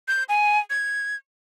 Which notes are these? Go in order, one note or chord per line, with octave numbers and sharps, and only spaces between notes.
G6
G#5
G#6